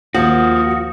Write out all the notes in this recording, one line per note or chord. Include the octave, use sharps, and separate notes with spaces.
D#2 F3 F#4 D#6